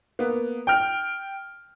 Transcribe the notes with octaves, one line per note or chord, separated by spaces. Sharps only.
A#3 B3
G5 F6